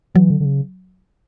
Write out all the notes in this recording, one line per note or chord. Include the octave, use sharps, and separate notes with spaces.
E3 F#3
D3
D3
C#3